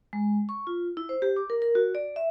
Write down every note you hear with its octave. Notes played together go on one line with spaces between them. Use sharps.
G#3
C#6
F4
E4
C5
G4
D6
A#4
A#4
F#4
D5
E5